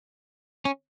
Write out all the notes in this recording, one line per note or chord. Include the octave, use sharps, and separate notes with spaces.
C#4